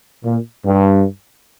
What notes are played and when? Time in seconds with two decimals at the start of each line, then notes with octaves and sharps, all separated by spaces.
0.23 A#2
0.66 G2